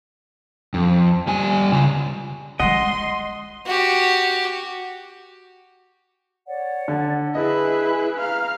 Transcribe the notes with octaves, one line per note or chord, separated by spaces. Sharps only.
F2
G3 G#5
C#3 F4
F#3 G#3 D#5 F#5 C6 D#6 A#6
F#4 G4
C#5 D5 F#5
D3
E4 G#4 B4 D#5
F5 A#5 F6